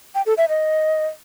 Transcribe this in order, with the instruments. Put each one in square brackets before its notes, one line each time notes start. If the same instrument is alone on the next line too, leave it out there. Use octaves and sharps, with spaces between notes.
[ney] G5
A4
E5
D#5